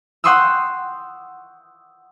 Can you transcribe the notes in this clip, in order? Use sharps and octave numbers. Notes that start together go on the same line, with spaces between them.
F#5 G5 C6 C#6 D#6 E6